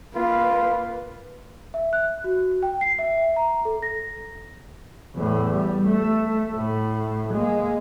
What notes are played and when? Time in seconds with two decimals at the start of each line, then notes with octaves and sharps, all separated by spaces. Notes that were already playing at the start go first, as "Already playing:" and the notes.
0.15 A#3 F4 B4
1.74 E5
1.93 F#6
2.24 F#4
2.63 G5
2.81 C7
2.99 E5
3.36 A#5
3.65 A4
3.82 A#6
5.15 E2 A2
5.53 G3
5.86 A3
6.54 A2
7.33 G#3 A#3